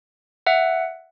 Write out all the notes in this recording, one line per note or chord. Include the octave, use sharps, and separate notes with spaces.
E5 F#5